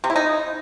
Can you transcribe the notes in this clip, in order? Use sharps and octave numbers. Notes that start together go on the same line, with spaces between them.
C3
E4
D#4